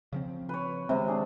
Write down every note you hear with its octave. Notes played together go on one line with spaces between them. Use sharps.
C#3 F3 C4
B4 C#5
C3 D#3 G#3 C4
D4 G#4